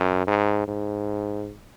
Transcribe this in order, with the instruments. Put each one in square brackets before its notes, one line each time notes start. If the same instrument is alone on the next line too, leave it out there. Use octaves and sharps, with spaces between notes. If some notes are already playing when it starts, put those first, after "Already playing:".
Already playing: [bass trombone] F#2
G#2
G#2